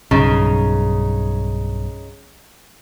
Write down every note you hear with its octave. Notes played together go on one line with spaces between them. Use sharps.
B1 G2 C#3 D#4